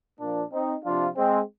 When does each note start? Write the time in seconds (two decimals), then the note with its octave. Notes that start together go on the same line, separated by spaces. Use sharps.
0.20 A#2 F3 A#3 D4
0.52 C4 D#4
0.85 C3 F3 D4 F4
1.17 G#3 C4